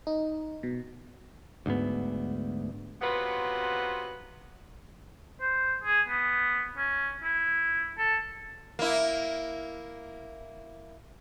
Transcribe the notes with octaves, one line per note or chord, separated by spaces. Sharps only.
D#4
B2
D2 G#2 B3
C3 F#3 B3 F4 B4 F#5
C5
G#4
B3
C#4
E4
A4
A#3 E4